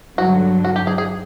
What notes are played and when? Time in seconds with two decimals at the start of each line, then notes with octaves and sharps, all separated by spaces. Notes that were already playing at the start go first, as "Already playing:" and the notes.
0.18 G2 D3 F#3 F#4
0.65 F#4
0.76 G4
0.87 G#4
0.98 G#4